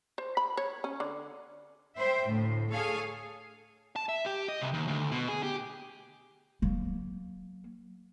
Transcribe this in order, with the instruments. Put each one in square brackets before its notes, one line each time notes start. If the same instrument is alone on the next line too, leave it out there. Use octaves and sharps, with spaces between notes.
[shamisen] C5
B5
C#5
C#4
D3
[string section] C5 E5 G5
D2 A2
G#4 A4 C#5 F5 G#5
[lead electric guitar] A5
E5
G4
D#5
C2
D#2
D2
B2
G#4
G4
[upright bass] F#3 A#3